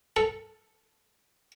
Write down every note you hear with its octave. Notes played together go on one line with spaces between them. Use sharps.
A4